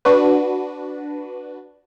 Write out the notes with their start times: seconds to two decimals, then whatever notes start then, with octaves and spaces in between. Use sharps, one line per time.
0.05 D4 F#4 B4